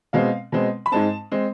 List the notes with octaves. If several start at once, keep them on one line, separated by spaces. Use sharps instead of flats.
B2 G#3 C4 F5
B2 G#3 C4
B5
G#2 G#3 C4 A5
G#3 C4